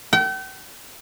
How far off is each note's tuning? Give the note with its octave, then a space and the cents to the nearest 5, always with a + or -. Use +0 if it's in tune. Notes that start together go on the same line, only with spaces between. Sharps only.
G5 -40